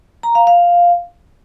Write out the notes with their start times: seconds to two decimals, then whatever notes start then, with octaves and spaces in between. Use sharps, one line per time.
0.23 A#5
0.35 F5
0.47 F5